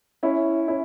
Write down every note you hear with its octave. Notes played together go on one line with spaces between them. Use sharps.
C#4 E4
C#4 E4